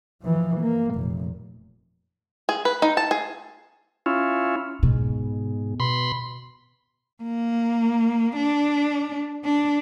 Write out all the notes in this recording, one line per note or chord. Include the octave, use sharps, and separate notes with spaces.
E3 F3
A#3
F1 A#2
G#4
B4
D#4
A5
G#4
C#4 E4 F4
G#2 B2
B2 B5 C6
A#3
D4
D4